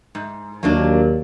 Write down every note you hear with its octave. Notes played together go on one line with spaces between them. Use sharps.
G#2
D#2 F#3 A#3 D4